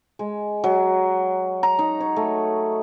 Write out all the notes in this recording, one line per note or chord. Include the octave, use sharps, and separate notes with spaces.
G#3
F#3
A#5
D#4
C#5
A3